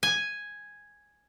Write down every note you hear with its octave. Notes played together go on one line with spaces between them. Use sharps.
G#5